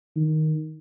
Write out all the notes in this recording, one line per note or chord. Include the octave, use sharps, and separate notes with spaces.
D#3